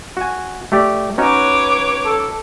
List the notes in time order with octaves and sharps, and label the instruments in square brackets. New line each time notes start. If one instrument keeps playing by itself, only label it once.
[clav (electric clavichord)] F#4 G#5
A3 G4 D5
[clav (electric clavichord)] C#4 D#4 F#4 [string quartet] B4 C#5 D6
[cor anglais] A4